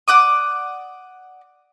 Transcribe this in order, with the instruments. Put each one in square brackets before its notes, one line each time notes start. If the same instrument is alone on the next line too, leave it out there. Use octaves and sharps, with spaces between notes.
[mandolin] D5 F#5 D6 D#6